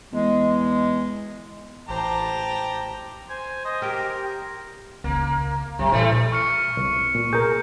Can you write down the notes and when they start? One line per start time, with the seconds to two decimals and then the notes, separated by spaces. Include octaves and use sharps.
0.13 E2 G#3
1.89 A1 G4 C5 A5 A#5
3.30 C5 G#5
3.65 C5 D#5
3.82 G4 A#4
5.04 C#2 C3 A#3
5.79 F#2 C3 G3
5.92 A#2 E3 G3 A3
6.32 C#6 F6 C#7
6.77 C2
7.15 A#2
7.33 G#4 A#4 G6